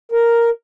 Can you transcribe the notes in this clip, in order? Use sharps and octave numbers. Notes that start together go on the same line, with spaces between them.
A#4